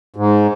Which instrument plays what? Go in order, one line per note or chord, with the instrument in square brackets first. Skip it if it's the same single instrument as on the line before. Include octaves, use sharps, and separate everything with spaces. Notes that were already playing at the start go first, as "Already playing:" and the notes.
[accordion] G#2